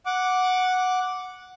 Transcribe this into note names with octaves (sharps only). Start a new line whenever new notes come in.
F#5 D6